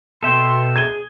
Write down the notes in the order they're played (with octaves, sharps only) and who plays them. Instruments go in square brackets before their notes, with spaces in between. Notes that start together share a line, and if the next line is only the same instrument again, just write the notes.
[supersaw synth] B2 [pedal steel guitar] A4 E5 G5 [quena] C6
[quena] G#4 [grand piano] G#6 D#7 G7